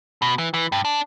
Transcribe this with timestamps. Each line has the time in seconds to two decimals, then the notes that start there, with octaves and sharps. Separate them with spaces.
0.22 B2
0.38 E3
0.54 E3
0.72 G2
0.85 D4